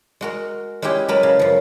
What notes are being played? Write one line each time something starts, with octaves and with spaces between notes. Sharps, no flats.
G#3 F#4 A#4
G#3 C#4 E4 G4 D#5
F#3 G#3 A#4 B4 A5 B5
C#3
F#2 F3